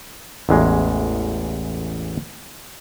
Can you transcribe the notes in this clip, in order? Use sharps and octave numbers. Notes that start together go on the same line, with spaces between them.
A1 E2 G#3